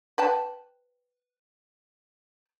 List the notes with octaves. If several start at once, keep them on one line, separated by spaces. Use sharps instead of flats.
B4 G5 A5